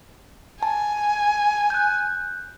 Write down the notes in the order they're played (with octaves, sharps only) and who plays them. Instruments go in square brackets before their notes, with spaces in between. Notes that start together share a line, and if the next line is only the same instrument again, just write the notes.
[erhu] G#5 [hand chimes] A5
[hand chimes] F#6 G6